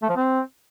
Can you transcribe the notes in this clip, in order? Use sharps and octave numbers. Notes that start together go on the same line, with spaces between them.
A3
F3
C4